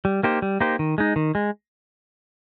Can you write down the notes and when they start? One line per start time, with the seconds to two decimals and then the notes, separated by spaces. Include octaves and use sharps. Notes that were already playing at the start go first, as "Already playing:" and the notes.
0.05 G3
0.23 A#3 D#4 G4 C5
0.42 G3
0.61 A#3 D#4 G4 C5
0.79 D#3
0.98 G#3 D#4
1.16 D#3
1.35 G#3